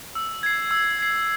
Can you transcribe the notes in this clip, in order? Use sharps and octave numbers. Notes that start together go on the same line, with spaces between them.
E6
G#6 C7
E6
G#6 C7